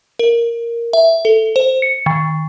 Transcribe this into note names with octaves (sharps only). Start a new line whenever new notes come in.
A#4
E5
A4
C5
C#7
D#3